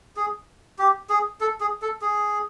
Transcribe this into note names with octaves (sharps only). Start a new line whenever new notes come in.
G#4
G4
G#4
A4
G#4
A4
G#4